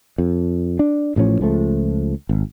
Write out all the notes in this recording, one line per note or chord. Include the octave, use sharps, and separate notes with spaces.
F2
D4
A1 A2 F3 C#4
C#2 F3 A3
G#1